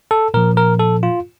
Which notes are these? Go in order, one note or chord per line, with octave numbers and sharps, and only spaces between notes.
A4
A#2 F3 A#4
A#4
A4
F4